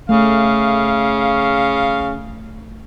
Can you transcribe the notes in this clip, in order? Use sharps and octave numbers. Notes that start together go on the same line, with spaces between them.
C#3 A3 F5